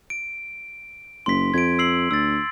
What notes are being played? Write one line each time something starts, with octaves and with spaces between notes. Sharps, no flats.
D7
F#1 C6 B6
F2 G#6 D7
E6 C7 F#7
D2 E6 A6